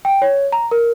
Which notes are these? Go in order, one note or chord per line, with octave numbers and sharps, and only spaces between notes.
G5
C#5
A#5
A#4